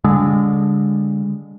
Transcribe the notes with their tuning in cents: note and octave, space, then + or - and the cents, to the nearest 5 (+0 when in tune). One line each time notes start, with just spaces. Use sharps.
D3 -25 G#3 -35